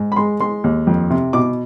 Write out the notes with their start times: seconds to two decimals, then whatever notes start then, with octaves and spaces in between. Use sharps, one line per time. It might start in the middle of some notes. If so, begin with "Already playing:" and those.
Already playing: G#2
0.12 B5
0.16 G#3 C6
0.40 G#3 C6
0.64 D#2
0.87 F2
1.10 C3
1.33 B2 D6